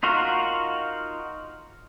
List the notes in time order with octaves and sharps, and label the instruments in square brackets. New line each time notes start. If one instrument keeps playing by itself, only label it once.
[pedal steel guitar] D#4 F4 F#4 A#4